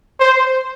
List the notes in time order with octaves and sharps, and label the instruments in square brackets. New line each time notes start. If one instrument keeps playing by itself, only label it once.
[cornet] C5